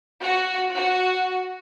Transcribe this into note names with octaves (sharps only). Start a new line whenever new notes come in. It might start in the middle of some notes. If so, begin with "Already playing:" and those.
F#4
F#4